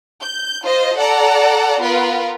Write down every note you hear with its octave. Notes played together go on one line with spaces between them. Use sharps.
G6
F4 C5 D#5
A4 D5 F#5 A#5
B3 F4 A#4 B4